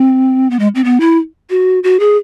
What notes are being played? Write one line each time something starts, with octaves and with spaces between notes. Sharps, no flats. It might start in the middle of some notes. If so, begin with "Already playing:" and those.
Already playing: C4
B3
G#3
C4
B3
E4
F#4
F#4
G#4